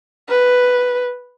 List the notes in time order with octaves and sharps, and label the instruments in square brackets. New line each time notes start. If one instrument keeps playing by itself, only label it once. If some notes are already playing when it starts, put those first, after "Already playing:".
[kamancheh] B4